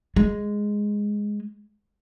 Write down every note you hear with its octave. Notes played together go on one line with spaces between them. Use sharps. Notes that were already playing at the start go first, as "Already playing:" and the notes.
G#3